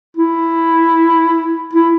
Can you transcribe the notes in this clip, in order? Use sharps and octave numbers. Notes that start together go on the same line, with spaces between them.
E4
E4